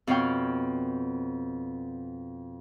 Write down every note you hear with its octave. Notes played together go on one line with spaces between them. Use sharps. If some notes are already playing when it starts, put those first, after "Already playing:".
F2 B2 C#5 F5 G5